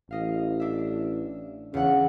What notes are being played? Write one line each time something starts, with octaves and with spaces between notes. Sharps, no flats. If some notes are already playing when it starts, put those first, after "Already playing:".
A1 D#5 F5
D4 E5
E2 C#3 F#5